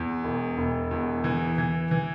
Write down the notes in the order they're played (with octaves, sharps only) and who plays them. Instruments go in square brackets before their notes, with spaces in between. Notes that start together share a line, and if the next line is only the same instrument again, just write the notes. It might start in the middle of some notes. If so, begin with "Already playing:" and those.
Already playing: [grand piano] E2
E1
E1
E2
E3
E3
E3